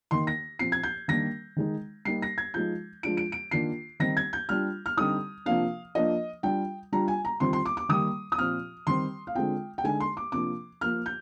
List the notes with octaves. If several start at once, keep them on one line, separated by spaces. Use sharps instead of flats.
D#3 A#3 D#4 C6
A#6
A#2 F3 C4 C7
G#6
G6
D#3 G3 A#3 D4 A#6
D#3 G#3 D#4
G3 A#3 D#4 C7
A#6
G#6
F3 G#3 D#4 G6
F3 G#3 D4 F4 D7
D7
D7
D#3 A#3 D4 F4 C7
D#3 G3 C4 D#4 A#6
G#6
G6
G3 D4 F4 F6
F6
D3 G3 C4 D#4 D#6
C3 F3 A#3 D4 F5
F3 A#3 D4 D#5
G3 D4 F4 G5
G3 D4 F4 A#5
G#5
A#5
D#3 G3 C4 F4 C6
C6
D6
D6
D#3 G3 A#3 D#6
D#6
A#2 F3 C4 F4 F6
D#3 G3 C4 C6
F5
D3 G#3 C4 F4 G5
G5
D3 G#3 D#4 G#5
C6
D6
C3 F3 A#3 D4 D6
F3 A#3 F4 F6
G6